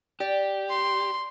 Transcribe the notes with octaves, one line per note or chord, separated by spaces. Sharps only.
G4 D5
C6